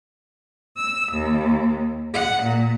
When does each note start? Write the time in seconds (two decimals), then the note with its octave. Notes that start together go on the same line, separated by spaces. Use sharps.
0.75 E6
1.11 D#2
2.12 F#5
2.42 A#2